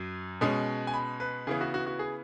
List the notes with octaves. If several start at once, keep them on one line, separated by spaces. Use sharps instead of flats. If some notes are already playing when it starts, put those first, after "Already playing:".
Already playing: F#2 F#3
B2 G#3 C#4
G#5
B5
B4
C#3 E3 B3 G#4
F#4
F#4
F#4
G#4